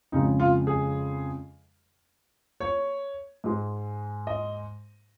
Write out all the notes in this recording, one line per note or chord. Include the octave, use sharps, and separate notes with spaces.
F2 C#3 G#3 D#4
F4
G#4
C#5
G#2 G#3
D#5